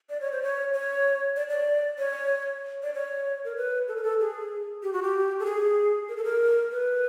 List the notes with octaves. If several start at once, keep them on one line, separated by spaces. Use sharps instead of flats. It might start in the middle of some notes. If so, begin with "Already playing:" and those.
D5
C#5
C5
C#5
C#5
D5
D5
C#5
D5
C#5
A#4
B4
A4
A#4
A4
G#4
G4
F#4
G4
A4
G#4
A#4
A4
A#4
B4